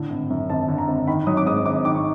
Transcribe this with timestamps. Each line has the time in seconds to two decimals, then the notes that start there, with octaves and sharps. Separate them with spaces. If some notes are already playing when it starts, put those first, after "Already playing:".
Already playing: A2 D3
0.10 G#1
0.30 F#2
0.50 G#1 A5
0.68 D3
0.78 A#5
0.88 G#1
1.07 D#3 B5
1.27 F#3 D#6
1.37 D6
1.46 G#2 D#6
1.66 G#1 D6
1.85 D#3 D6
1.95 C#6